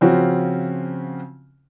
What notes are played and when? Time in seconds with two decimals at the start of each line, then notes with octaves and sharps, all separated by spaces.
0.01 C#3 F3 C4 C#4 F4 F#4